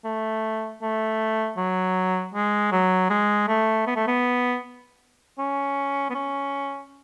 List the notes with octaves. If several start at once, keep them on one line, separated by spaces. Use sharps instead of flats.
A3
A3
F#3
G#3
F#3
G#3
A3
B3
A3
B3
C#4
B3
C#4